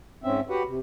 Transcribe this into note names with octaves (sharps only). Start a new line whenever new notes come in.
G#2 C4 C#4 E5
F#4 G4 B4 F#5
C3